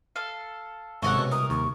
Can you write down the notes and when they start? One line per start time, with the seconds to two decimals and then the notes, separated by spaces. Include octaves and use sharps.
0.16 A4 F5
1.02 G#1 C3 G#3 C#4 A4 A#4 F#5 C#6
1.18 B2
1.31 C2 A#4 D#6
1.50 D#2 C#6